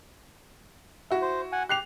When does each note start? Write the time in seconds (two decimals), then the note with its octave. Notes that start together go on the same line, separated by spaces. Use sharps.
1.11 E4 F#4
1.22 C5
1.52 F#5 G#5
1.69 G4 F#6 C7 F7